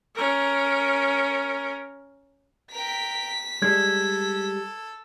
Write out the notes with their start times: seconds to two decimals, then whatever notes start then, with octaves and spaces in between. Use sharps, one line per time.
0.15 C#4 A#4
2.72 A#4 G5 B6
3.62 G3 G#3 A4 G#6